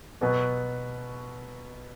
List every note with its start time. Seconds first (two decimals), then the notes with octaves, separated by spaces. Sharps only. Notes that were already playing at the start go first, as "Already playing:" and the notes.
0.21 B2 F#3 B3